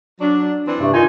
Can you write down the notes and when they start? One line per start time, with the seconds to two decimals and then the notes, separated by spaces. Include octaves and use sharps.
0.21 F#3 D4
0.68 E3 C4 D4
0.80 G2 C3 A3
0.94 D#3 D#4 F4 G#5